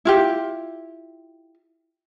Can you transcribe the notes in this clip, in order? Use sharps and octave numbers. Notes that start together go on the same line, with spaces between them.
E4 F4 G4